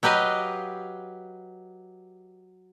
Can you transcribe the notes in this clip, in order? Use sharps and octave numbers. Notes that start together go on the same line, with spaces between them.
F#3 G4 B4 D#5 F5